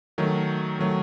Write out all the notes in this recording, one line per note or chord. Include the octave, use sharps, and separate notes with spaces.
D#3 F#3 A3
D#3 F#3 A3